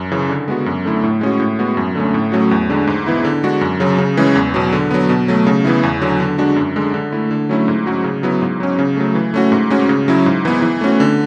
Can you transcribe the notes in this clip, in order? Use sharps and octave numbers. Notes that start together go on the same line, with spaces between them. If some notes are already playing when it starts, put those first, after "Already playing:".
Already playing: F#2
C#3 E3
D3
G#3 B3 F#4
F#2
D3 A3 E4
A2
G#3 C#4 F#4
A2
G#3 B3 F#4
F#2
D3 A3 C#4
A2
F#3 A3 C#4 F#4
E2
D3 G#3 D4
G#2
E3 B3 E4
D3
G#3 D4 F#4
F#2
C#3 F#3
C#3
E3 G#3 C#4
E2
B2 F#3
D3
F#3 B3
B2
F#3 A3
C#3
E3 B3 E4
E2
D3 F#3
D3
G#3 D4 F#4
F#2
D3 G#3
D3
A3 E4
D3
F#3 A3 C#4 E4
G#2
F#3 C#4 F#4
C#3
F#3 B3 E4
G#2
F#3 C#4
C#3
F#3 A3
E3
A3 C#4 F#4
G#2
G#3 C#4 F#4
C#3
F#3 C#4 E4
G#2
E3 B3
E3
A3 C#4 F#4
D3